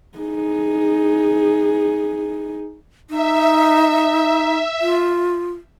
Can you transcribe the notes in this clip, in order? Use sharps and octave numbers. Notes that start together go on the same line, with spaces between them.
D#4 G#4
D#4 E5
F4